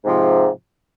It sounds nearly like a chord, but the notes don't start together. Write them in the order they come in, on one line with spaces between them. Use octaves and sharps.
G#2 C3 F3